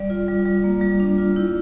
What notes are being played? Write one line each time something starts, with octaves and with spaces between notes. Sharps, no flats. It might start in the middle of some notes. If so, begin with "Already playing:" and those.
Already playing: G3 D5
F4
G3
G3
A#3
G3
D4
F4
E4